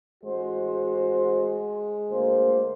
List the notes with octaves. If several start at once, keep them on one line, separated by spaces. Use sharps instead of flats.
A1 G#3 F#4 C5
D2 A#3 C5